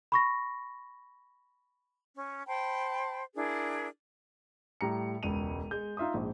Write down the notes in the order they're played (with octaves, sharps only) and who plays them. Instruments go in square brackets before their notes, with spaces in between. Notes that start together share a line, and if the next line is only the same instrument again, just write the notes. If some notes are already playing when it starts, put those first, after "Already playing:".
[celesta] B5 C#6 A#6
[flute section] C#4
C5 G5 A5 B5
D4 E4 G#4 A#4
[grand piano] A2 G3 A#5 C#7
E1 C#2 D#7 F7
G#3 G6
D#4 F4 E5 C6 D#6
A#1 G#2